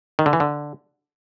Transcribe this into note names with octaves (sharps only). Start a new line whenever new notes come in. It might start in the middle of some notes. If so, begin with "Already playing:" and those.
D#3
D3
E3
D3